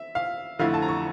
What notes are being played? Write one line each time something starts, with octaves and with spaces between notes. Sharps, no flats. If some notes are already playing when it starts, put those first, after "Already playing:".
Already playing: E5
F5
F2 D3 A3 E4 F5
A5
A#5
C#6